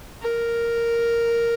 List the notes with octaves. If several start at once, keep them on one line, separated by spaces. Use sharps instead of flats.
A#4